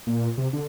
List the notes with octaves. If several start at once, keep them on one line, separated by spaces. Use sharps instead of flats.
A#2
C3
D3